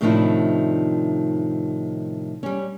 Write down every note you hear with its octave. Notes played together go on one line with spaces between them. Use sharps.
A2 C3 D#3 F3 D4 E4
G3 C#4